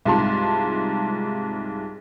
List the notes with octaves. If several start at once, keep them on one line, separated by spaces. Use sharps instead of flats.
C2 G#2 F4 A5 C6